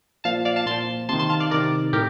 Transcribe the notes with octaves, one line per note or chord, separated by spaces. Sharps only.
A#2 F3 F5 A5
D5 F5
F5 A5
A#2 F3 A5 C6
C3 D#3 A5 C6
A5 C6
F5 A5
D5 F5
C3 D#3 A#4 D5
A2 G4 A#4